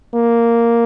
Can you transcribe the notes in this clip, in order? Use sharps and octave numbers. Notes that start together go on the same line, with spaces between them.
A#3